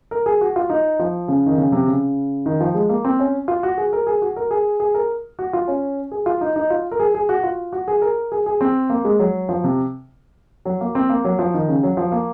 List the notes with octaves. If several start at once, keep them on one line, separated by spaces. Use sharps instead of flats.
A#4
G#4
F#4
F4
D#4
F3
C#3
D#3
C#3
C3
C#3
D#3
F3
G#3
A#3
C4
C#4
F4
F#4
G#4
A#4
G#4
F#4
A#4
G#4
G#4
A#4
F#4
F4
C#4
G#4
F4
D#4
D#4
F4
A#4
G#4
G#4
F#4
F4
F#4
G#4
A#4
G#4
G#4
C4
A#3
G#3
F#3
F3
C3
F#3
A#3
C4
A#3
F#3
F3
D#3
C#3
F#3
F3
A#3